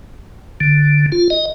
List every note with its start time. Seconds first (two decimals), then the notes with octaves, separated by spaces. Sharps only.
0.61 D3
1.12 F4
1.30 D#5